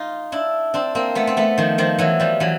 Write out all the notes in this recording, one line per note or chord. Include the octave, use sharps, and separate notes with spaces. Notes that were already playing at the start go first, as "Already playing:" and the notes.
Already playing: D#4 F4
D4 E4
C4 D4
A#3 C4
A3 B3
C4
A3 B3
D#3 F3
D#3 F3
E3 F#3
F3 G3
E3 F#3